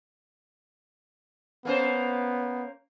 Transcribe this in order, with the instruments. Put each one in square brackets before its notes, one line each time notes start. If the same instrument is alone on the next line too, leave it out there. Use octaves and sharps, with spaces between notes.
[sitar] A#3 C#4 C5 [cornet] B3